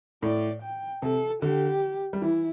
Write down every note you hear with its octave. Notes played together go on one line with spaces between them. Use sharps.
A2 D5
G5
C3 A4
D3 G4
G3
E3 E4